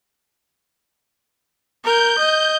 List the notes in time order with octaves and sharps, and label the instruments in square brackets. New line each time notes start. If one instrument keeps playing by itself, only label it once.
[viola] A#4 [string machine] G6
[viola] D#5